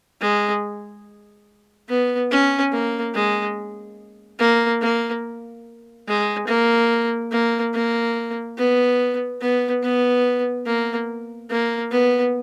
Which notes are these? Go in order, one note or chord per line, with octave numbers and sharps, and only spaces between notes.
G#3
B3
C#4
A#3
G#3
A#3
A#3
G#3
A#3
A#3
A#3
B3
B3
B3
A#3
A#3
B3